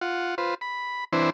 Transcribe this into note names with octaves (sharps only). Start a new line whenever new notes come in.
F4 F#5
F4 B4 C5
B5
E3 C4 D4 E4 B4 C5